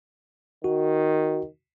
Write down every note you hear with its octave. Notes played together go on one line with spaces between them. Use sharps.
D#3 F#4